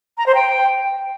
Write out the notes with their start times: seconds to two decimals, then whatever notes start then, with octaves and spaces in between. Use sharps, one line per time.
0.18 A#5
0.26 C5
0.35 G5